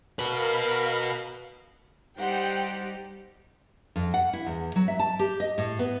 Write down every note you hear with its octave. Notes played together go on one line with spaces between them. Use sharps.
F#4 A#4 B4 F5 B5
G3 D#4 G4 C5 F#5 G5
F2
F#5
E4
E2
F#3
E5
A5
G4
D#5
A2
B3